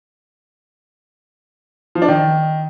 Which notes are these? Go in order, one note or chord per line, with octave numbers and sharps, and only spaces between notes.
F3
D4
D#3